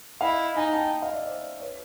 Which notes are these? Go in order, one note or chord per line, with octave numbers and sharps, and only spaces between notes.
E4 D#5 F5
D#4 G#5 A#5
G5 A5
D#5 F5
D5 E5
C5 D5
B4 C#5